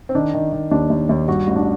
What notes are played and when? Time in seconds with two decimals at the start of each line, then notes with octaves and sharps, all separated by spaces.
0.09 C4
0.15 D#3 D4
0.34 D#3
0.52 D#3
0.71 D#2 D4
0.90 D#2
1.09 D#2
1.28 G2 F#4
1.47 A1
1.56 D4